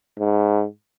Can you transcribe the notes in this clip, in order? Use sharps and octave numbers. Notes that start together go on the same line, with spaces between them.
G#2